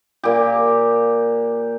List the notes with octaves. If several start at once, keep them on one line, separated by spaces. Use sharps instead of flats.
A#2 G4